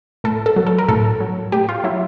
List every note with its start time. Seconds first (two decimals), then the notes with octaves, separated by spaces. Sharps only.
0.24 A2 A4
0.46 A4
0.56 F#3
0.67 A4
0.78 A#4
0.88 A2 A4
1.20 F#3
1.52 A2 G4
1.69 F4
1.84 F#3 E4